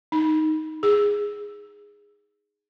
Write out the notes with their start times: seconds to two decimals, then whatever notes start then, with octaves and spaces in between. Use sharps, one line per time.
0.12 D#4
0.83 G#4